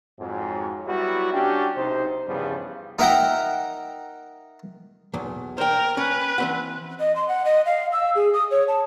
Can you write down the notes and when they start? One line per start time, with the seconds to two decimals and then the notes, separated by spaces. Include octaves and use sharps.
0.20 F2 G#2 F#3
0.87 F#3 G3 B3 E4 F#4
1.33 C#4 D4 F#4 G4
1.77 B1 C3 D#4 C5
2.27 E2 G2 C#3 F3 G3 B3
2.99 D#4 A#4 E5 F#5 G5 A#5
5.14 B1 E2
5.58 A#4 C5 G5
5.97 C#4 B4
6.38 E3 C4 F#5
7.00 D#5
7.16 C6
7.28 F#5
7.45 D#5
7.66 F5
7.92 E6
8.15 G#4
8.33 D#6
8.51 C#5
8.68 A5